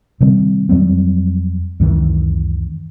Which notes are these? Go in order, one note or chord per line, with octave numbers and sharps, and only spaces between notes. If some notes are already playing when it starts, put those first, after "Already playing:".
C3 D#3 G3 C4
F2 F#3 G3 C4
C#2 F#2 D#3 E3